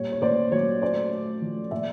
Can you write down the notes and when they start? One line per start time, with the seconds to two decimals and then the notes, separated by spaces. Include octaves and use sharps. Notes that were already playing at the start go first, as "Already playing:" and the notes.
Already playing: A#2 G3 C#5
0.12 C#5
0.22 A#2 C5 D5
0.52 F#3 C#5
0.82 A3 C5 D5
1.11 A3
1.42 F3
1.71 A#2 D5 E5